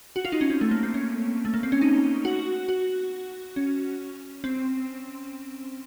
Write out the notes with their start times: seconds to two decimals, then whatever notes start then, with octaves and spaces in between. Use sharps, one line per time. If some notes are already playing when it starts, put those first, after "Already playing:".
0.16 F#4
0.25 F4
0.32 D#4
0.41 C#4
0.50 C4
0.61 A3
0.71 A#3
0.83 C4
0.94 C#4
1.45 A3
1.54 A#3
1.63 C4
1.72 C#4
1.81 D#4
2.25 F#4
2.69 F#4
3.56 C#4
4.44 C4